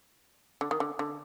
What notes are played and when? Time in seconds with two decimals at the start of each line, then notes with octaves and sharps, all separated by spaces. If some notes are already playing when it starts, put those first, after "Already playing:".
0.61 D3
0.71 D#3
0.80 D3
0.99 D3